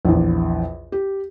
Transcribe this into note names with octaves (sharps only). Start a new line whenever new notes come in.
A#1 E2
G4